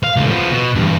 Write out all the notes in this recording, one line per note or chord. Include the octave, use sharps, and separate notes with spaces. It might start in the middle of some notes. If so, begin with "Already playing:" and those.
F5
C#2 A2
F3 B3
B2
E2 G2